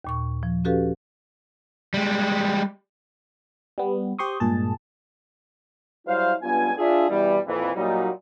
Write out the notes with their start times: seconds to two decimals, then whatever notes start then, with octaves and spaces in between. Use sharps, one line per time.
0.05 D#2 A#2 C#6
0.43 F3
0.65 C#4 F#4 G4 A4 B4 F5
1.94 G3 G#3
3.78 G3 B3
4.19 G4 C5 C6 C#6 D#6
4.40 G2 A#2 G#3 G#4 A5
6.08 F#3 G3 E4 C5 F5
6.42 C#2 G2 B3 F4 G#5
6.77 D4 F4 G#4 E5
7.09 B2 E3 G3
7.46 F2 A#2 E3
7.75 A#2 F#3 G3 D#4